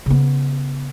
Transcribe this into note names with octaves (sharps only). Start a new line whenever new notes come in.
C#3 B3